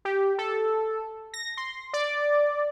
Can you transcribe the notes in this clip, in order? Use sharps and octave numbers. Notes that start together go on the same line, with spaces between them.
G4
A4
A#6
C6
D5